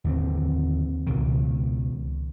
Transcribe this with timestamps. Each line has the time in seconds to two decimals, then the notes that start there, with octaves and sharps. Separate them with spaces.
0.04 D#2 D3 C4
1.07 C#2 B2 D#3